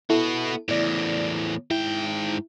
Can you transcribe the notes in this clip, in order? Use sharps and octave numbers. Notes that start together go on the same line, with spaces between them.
B3 E4 F#4 A4
E2 A2 E4 D5
G#2 E4 G5